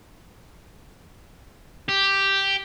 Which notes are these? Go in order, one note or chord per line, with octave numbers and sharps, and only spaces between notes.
G4